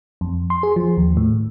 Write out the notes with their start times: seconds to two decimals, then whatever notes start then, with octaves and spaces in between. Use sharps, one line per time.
0.21 F2
0.50 C6
0.63 G#4
0.76 F3
0.97 D#2
1.17 A2